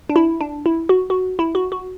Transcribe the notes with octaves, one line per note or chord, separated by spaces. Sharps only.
D4
E4
D4
E4
F#4
F#4
E4
F#4
F#4